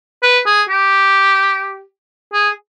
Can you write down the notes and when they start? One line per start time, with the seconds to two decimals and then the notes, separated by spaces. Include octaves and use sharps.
0.23 B4
0.46 G#4
0.69 G4
2.33 G#4